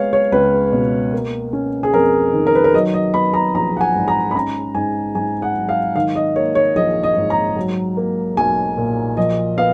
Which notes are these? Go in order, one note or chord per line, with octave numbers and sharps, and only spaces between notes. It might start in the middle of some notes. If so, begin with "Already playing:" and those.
Already playing: G#3 B3 C#5 F5
C#5
C#2 B4
B2
A#3
C#4
G#4
F2 A#4
D#3
A#4
B4
A#4
F#3 D#5
D#5
B3 B5
A#5
A#1 A#5
F#5
G#5
G#2
A#5
B5
C#4 A#5
G#2 G#5
G#2 G#5
F#5
F#3
F5
D#3 F5
D#5
A#3 C#5
C#5
A#1 D#5
D#5
G#2
A#5
F#3
A#3
B1 G#5
A#2
F3 D#5
B3 F5